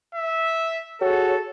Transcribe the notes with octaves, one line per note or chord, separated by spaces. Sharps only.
E5
F#4 G#4 A4 C#5